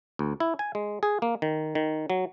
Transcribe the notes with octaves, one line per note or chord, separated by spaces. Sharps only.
D2
E4
G#5
G#3
G#4
A#3
D#3
D#3
F#3